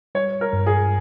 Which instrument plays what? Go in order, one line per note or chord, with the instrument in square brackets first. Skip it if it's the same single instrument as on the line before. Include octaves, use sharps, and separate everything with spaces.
[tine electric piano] G3 [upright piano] C#5
[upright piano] A#4
[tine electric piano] G2
[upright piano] G#4